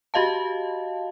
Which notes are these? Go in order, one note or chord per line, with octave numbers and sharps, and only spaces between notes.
F#4 G4 D#5 F5 A5